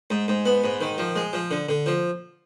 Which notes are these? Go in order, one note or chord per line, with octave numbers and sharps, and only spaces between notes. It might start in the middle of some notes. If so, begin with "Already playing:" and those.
G#2
G#2
B3
G#2
D#3
F3
G#3
F3
D3
D3
F3